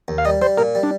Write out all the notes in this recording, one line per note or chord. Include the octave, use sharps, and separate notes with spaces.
D#2
F5
G3 D#5
G3 C5
A#2 A#4
G3
D4